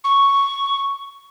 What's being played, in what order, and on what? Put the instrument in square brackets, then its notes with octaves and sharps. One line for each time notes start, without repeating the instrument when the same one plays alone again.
[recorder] C#6